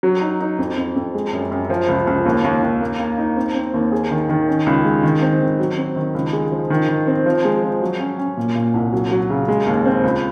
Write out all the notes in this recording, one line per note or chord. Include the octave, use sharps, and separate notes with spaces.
F#3
D#4
D#4
F2
F2
F2
G#3
F#2
F#2
F3
C#2
C#2
D#2
D#2
D#2
A#3
A#3
D#4
C4
C4
D#2
G#4
D#3
D#3
C#4
C#2
G#3
D#3
C4
D#3
F#3
C4
D#3
C#2
G#3
F3
D#3
D#3
C4
F3
G#3
F3
F#3
C#4
C#4
A#2
A#2
C2
F#3
F#3
C#3
G#3
D#2
C4
C#2